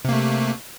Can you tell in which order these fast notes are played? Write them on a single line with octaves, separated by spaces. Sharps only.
C3 A#3 A3